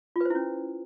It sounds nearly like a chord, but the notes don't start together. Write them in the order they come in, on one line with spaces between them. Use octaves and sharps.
F4 B4 C5 E4 C#4